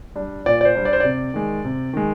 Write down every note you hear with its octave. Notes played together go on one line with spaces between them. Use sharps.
G3 D4
A#2 D5
D5
C5
G3 D4
D5
C5
C3 D5
D#3 G#3
C3
D#3 G#3